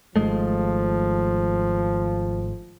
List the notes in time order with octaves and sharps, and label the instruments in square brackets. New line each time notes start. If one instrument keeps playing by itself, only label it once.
[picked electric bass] G#1 G#3 A3 [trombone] F3